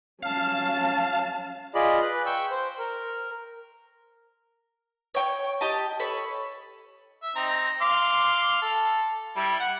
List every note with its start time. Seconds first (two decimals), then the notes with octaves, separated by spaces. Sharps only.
0.23 C#4 F5 A5
1.75 F4 G#4 D5 D#5 B5
2.03 B4 F#6
2.26 G5 C#6 E6
2.51 C5
2.78 A#4
5.14 C#5 G5 C#6
5.61 G4 D#5 A5
5.99 A4 C#5 B5
7.23 E5
7.36 C4 D#4 A#5
7.81 F5 C6 D6
8.62 A4
9.36 G3 E4
9.60 F#5